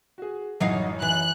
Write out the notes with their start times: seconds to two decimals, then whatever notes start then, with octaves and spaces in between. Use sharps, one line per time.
0.18 F#4 G#4
0.60 A1 F#2 F#3 D#4 F5
1.02 E3 F#6